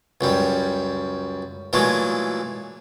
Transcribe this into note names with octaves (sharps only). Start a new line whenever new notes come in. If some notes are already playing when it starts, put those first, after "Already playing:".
C#2 F#2 G3
A#2 E3 F#3 G#3 A3